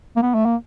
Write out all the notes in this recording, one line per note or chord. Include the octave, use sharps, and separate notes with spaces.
A#3
B3
A3
A#3